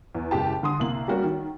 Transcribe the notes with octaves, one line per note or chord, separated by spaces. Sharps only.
E2
F#1 G#3 G4 A5
D3 C6 D#6
C2 A#3 F#7
G3 A#3 C#4 F#4 A#4
D#3